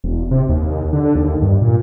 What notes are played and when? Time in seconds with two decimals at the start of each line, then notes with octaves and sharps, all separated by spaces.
0.04 E1
0.31 C3
0.49 D#2
0.93 D3
1.15 D#2
1.42 G2
1.62 A#2